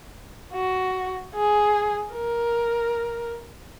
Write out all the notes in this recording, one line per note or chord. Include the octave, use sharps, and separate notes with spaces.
F#4
G#4
A#4